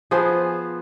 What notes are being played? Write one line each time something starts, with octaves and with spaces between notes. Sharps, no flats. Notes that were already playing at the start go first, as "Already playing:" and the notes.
F3 B3 G#4 C5